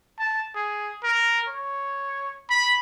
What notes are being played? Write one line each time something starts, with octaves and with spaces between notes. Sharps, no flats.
A5
G#4
A#4
C#5
B5